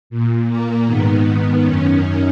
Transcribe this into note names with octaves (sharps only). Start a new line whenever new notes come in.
A#2
A#3
G#2 D#3 B3
F#2 D#3 C#4
C#4